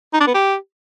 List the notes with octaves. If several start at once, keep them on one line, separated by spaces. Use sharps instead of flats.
D#4
D4
B3
G4